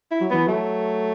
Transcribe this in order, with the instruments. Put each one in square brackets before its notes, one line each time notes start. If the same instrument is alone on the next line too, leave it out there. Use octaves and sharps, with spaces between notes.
[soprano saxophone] E4
[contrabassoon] F#3
[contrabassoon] E3 [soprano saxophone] B3
[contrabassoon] F#3 [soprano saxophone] A3